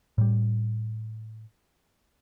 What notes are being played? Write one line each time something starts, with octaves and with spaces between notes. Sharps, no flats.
A2 G3